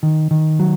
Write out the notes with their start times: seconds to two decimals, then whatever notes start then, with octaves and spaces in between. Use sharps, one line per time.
0.03 D#3
0.31 D#3
0.59 F#3